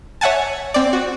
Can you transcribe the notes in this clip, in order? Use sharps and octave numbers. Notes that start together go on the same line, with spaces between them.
C#5 E5 F#5 G#5 A5
C4 D5
F#4